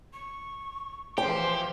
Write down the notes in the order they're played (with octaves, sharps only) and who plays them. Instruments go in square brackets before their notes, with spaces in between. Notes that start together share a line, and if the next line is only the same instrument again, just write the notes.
[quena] C#6
[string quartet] E3 F3 [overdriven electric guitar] G4 [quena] C5 [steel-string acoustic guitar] G5